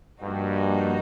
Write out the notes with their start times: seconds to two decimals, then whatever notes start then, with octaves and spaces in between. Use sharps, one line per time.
0.23 G2 F3 A#3 D#4 F#4